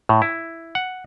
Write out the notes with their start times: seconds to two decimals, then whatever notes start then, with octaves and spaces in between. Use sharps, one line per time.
0.09 A2
0.22 E4
0.75 F#5